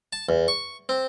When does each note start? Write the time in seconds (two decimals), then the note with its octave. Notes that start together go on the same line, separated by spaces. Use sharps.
0.13 A5
0.29 E2
0.48 C#6
0.89 C4